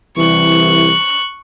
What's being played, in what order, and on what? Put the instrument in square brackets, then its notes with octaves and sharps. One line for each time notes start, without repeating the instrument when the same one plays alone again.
[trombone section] C2 [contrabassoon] E3 [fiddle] C#6 F#6